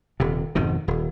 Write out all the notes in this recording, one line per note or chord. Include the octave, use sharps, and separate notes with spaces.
D#1 C3
G#1 F2 B2 D#3
D#1